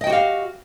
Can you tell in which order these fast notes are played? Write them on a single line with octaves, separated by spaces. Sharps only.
D#5 G5 F#4 G4 F5